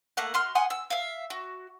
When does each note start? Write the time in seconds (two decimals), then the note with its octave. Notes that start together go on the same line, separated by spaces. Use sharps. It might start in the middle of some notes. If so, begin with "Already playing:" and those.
0.17 A3 A#3 F#5
0.34 F#4 C6 F6
0.55 F#5 G#5 C6 D#6
0.70 E6
0.90 E5 F5
1.30 F#4